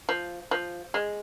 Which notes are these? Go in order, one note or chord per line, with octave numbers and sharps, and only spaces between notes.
F3
F3
G#3